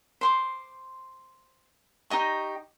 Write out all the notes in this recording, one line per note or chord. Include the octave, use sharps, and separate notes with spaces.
C5 C6 D6
D#4 G4 D#5 C#6